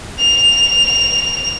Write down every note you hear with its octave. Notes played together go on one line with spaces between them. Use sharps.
F7